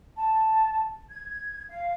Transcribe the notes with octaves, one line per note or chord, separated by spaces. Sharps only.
A5
G#6
F5